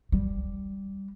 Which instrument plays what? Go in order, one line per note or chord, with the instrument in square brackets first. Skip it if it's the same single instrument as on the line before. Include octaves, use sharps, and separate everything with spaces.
[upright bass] G3